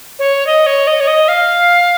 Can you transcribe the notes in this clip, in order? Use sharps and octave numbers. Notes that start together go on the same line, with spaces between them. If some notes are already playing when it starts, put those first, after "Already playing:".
C#5
D#5
C#5
D#5
C#5
D#5
F5